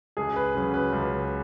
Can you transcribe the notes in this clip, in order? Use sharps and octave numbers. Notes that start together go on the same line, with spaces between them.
C#2 G#4
B4
C#3 F#3
B4
C#2